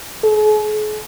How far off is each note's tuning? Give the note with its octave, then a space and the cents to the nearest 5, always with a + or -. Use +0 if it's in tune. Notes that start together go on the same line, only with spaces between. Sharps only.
G#4 +45